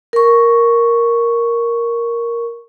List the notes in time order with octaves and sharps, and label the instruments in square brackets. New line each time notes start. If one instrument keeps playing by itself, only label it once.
[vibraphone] A#4 C#6